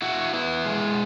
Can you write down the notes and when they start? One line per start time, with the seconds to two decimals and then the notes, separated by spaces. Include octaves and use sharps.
0.02 E4 F#4
0.34 B3 E4
0.65 G#3